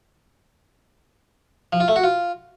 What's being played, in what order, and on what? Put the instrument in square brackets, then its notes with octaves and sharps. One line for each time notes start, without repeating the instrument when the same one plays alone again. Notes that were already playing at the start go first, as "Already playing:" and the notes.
[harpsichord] F3
F4
A3
F#4
F4